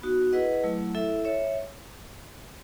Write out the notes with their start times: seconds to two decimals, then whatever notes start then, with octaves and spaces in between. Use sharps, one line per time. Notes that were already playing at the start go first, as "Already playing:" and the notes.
0.02 B3 D#4 F#4
0.33 E4 G#4 B4 D#5 F#5
0.64 F#3 A3 E4
0.95 E4 A4 E5
1.25 C#5 E5